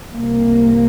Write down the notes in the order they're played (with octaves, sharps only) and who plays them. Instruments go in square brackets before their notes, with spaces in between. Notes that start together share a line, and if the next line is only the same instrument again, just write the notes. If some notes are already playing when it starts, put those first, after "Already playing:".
[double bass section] C2 C3 A#3